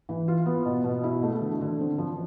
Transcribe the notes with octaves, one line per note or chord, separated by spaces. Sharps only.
E3
F4
B3
B2
B2
E4
A3
D3
D3
C4
F3